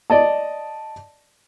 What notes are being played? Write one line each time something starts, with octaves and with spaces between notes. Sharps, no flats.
D5 D#5 A5